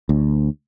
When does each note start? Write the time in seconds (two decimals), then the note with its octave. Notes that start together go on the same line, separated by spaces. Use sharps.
0.09 D2